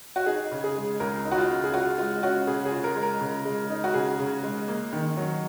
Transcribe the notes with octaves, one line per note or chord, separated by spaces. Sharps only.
F#4
D#4 G#4
C#3
G#4
G#3
C#2 A#4
D#4
F#4
F4
C#3
G#4
F4 F#4
G#3 F4
C#4 F#4
C#3 G#4
G#4
F4
A#4
G#3
A#4
C#3
G#3
D#4
F#4
C#3 G#4
C#3
G#3
A#3
D#3
F#3